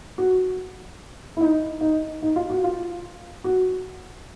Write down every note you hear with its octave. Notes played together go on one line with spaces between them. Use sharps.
F#4
E4
D#4
D#4
D#4
F4
F#4
F4
F#4